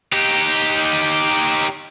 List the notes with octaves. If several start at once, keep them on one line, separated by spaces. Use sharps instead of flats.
D#4 G4